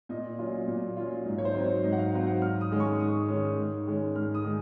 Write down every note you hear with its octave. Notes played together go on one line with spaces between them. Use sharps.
A#2 D#5
F#3 C#4 F4
A#2
F#3 C#4 F4
G#2
C#5
C5
F#3 C4 D#4
C#5
G#2 D#5
F#5
F5
F#3 C4 D#4 F#5
F#5
G#2 F6
D#6
D#3 G#3 C#4
C#6
G#2 D#6
D#3 G#3 C#4
G#2
D#3 G#3 C#4
G#2 F6
D#6
D#3 G#3